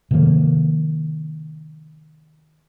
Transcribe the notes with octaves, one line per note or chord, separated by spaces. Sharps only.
C3 D#3 F3 A#3